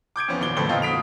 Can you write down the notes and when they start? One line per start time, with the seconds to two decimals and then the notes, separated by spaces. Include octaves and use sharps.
0.16 D6 G6 G#6 D7
0.28 F2 E3 B3 C#4
0.41 D#1 D4 F#4 G7
0.57 G1 F2 A2 A3 A4 G7
0.69 F2 A#2 A#3 F4 D#5 G5
0.82 F#4 D#6 B6 D7 F7